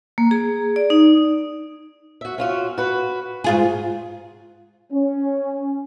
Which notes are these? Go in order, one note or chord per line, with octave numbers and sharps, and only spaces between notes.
A#3
G#4
D5
D#4
F#4 E5
C#4 F4 F#4
F#4 B4
G#2 F4 F#4 G#4
C#4